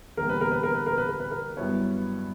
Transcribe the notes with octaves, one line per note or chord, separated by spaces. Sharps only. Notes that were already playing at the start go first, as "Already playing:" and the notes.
E2 D3 G3 A#3 A#4
B4
A#4
B4
A#4
B4
A#4
B4
A#4
B4
A#4
G2 F#3 B3 E4 B4 C#5